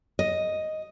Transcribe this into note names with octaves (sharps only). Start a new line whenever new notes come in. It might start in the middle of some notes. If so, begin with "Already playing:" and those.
D#5